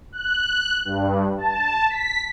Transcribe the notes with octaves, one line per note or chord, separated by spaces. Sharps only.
F#6
G2
A5
B6